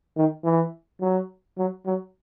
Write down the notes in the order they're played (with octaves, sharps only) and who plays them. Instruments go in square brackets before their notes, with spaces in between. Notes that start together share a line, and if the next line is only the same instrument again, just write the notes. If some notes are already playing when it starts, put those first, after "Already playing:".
[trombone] D#3
E3
F#3
F#3
F#3